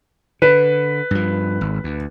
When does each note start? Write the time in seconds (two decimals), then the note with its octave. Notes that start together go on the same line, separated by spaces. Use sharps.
0.42 D3 B4
1.11 G2 F3
1.61 G#1
1.84 D2